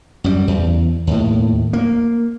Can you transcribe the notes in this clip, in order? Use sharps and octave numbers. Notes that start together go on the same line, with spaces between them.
F#2 G3
E2
D#2 A2
A#3